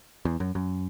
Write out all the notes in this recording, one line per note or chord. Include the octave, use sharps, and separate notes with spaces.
E2
F#2
F#2